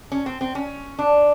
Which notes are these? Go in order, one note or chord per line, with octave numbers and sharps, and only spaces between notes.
C#4
C4
C4
C#4
D4